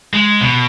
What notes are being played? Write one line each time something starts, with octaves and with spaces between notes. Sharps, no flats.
G#3
B2